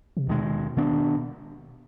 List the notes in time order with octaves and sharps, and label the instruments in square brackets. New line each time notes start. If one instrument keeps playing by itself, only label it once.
[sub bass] C3
[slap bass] D#2 D#3 G#3 [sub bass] B2
[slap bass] D#3 B3 D4